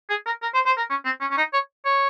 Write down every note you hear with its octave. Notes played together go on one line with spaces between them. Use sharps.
G#4
A#4
A#4
C5
C5
A#4
C#4
C4
C#4
C#4
D#4
C#5
C#5